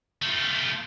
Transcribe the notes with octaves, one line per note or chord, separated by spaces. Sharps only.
A3 F4